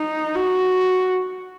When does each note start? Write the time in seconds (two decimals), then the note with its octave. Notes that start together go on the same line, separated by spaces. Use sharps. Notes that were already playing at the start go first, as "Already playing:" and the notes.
Already playing: D#4
0.35 F#4